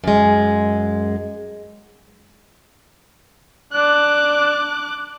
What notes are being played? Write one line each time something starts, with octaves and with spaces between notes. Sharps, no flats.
F#2 G#3
D4 D6 F#6